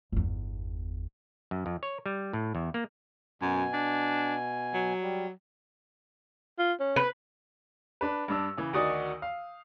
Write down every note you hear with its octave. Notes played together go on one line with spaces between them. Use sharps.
G1 E2
F#2
F2
C#5
G3
A2
E2
A#3
F#2 B2 G#5
D4
F#3
G3
F4
C#4
B4
D4 B4
G2 D4 E6
C#3 E3
D2 D#3 D#4 F#4 D5 D#6
F5